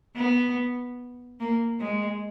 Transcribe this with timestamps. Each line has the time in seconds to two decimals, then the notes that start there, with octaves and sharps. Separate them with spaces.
0.16 B3
1.40 A#3
1.80 G#3